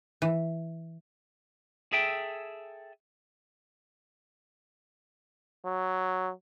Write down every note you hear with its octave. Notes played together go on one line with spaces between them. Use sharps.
E3
G#4 A4 E5 G5
F#3